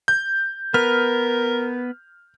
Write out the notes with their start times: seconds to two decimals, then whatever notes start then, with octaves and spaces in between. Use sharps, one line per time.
0.08 G6
0.74 B3 A#4 B4 F6